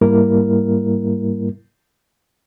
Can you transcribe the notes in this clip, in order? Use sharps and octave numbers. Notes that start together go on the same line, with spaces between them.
G#2 G3 A#3 E4 A#4